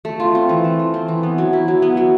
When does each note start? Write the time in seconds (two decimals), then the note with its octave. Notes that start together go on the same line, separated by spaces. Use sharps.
0.05 A3
0.20 F4
0.35 C4
0.49 E3
0.64 A3
0.79 F4
0.94 C4
1.08 E3
1.23 B3
1.38 F#3
1.53 E4
1.68 F#3
1.82 B3
1.97 F#3